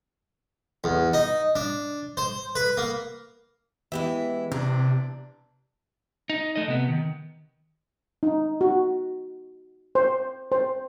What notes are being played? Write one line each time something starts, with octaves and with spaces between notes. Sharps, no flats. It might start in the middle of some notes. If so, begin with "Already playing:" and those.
E2
D#4
D4
C5
B4
A#3
E3 G#3 B3 E4 G4 E5
C3 D4 A#5
D#4
A3 D#5
C3 B3
D#3
D#4
F#4
C5
C5